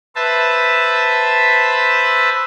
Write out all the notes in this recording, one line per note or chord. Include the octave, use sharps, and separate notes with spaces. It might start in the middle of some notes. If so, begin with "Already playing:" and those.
B4 C5 E5 A5 B5